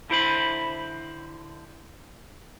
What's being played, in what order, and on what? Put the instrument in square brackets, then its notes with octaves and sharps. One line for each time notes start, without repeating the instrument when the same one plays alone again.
[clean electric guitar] D3 E4 C5 B5